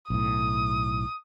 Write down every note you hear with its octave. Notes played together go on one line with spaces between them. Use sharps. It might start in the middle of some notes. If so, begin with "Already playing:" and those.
B1 A2 D#6